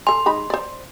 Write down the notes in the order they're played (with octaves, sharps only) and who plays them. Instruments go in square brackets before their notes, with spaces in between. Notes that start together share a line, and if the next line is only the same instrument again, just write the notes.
[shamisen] A4 G#5 [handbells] C6
[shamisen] G#3 D#4 B5
C5 D5